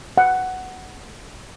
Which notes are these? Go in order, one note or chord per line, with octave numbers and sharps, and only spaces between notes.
F#5